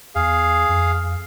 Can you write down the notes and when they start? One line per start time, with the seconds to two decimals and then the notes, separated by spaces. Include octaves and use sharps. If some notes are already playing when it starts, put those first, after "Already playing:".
0.15 E2 G#4 F5
0.69 F2